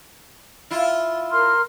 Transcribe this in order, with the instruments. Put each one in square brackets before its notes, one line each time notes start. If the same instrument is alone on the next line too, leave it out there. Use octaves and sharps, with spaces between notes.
[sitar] E4 F4
[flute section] A#4 C6 F6